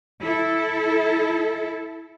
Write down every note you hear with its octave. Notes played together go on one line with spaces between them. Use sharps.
E4 A4